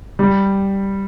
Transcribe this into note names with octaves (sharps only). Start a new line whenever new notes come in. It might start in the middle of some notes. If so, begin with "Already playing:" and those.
G3